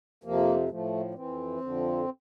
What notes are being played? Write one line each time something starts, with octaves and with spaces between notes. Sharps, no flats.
F2 C3 F3 A#3
A2 F3 A3
D4
F2 E3 C4
F2 D3 F3